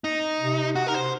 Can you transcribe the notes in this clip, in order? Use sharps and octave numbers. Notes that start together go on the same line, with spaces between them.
D#4
C3
F#4
A#4
C5